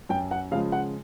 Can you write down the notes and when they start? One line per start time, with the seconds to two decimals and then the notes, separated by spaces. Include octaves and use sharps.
0.09 F#2 G5
0.31 F#5
0.52 C#3 F3 G#3 F5
0.72 F#5